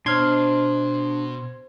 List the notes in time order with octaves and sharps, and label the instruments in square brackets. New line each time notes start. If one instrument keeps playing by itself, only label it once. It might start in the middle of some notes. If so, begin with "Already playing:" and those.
[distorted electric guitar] B2 [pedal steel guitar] D4 F6 [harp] C5 C#5 D#5 [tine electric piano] C6 G#6